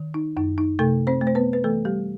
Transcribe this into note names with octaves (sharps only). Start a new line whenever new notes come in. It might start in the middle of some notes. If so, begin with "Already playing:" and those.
Already playing: D#3
D#4
F#2 D#4
D#4
C3 A3 A4
C4 C5
A3
C5
B3 B4
B4
E3 A3 A4
G3 G4